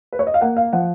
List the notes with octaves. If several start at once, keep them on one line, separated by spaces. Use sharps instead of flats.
B4
C#5
D#5
F5
A#3 F#5
F5
F3 F#5